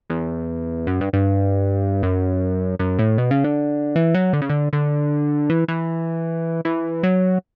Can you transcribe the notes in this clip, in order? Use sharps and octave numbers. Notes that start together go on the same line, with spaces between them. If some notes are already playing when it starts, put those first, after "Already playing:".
E2
F#2
G2
G2
F#2
F#2
A2
B2
C#3
D3
E3
F#3
D3
C#3
D3
D3
E3
E3
E3
F#3